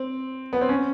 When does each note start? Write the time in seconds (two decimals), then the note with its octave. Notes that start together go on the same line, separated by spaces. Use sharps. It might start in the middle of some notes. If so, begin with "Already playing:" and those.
Already playing: C4
0.53 B3
0.61 C4
0.69 C#4